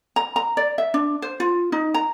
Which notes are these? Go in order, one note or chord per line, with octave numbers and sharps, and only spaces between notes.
A#5
A#5
D5
E5
D4
C5
F4
D#4
A#5